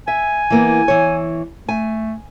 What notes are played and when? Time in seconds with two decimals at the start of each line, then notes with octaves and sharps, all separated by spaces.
0.08 E5 G#5
0.50 E3 A#3 B3
0.88 E3 C#5
1.69 A3 G#5